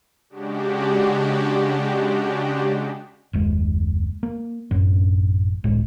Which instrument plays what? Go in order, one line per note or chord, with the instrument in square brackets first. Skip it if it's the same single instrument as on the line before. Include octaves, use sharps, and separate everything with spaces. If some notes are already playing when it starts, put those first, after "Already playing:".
[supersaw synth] C#3 G#3 D4 F#4 G4
[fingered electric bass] F#1 D#2 G#3
A#3
A1 F#2 C#4
G1 C#2 A2 G#3